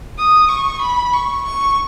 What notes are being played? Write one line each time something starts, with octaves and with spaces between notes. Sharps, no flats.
D#6
C#6
B5
C#6
C#6